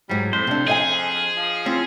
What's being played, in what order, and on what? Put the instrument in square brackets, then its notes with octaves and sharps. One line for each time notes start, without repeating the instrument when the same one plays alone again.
[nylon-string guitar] G#2 F#3 [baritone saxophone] G3
[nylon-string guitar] F2 [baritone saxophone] A2 [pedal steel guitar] C5
[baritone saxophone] F2 [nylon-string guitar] C3 D4
[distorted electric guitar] G#4 [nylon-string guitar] D#5 E5 G#5
[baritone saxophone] F3
[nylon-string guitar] C4 F4 [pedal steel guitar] C#4